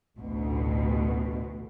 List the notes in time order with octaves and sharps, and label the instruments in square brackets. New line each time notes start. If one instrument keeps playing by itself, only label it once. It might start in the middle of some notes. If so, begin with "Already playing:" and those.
[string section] A1 D2 B2